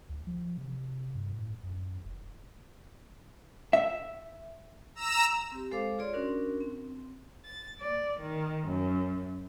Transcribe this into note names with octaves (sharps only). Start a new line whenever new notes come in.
D2
F3
C3
G2
A2
F#2
F1
E5
A#5 E6 E7
C4 G4
G#3 A4 C5 F5 D6
F4 G#4 C#5 D5 C6
C#4 D4 F#4 A#4
C4
A6
D5
D#3
F#2